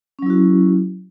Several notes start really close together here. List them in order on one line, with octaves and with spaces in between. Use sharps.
C#4 F#3 E4 F#4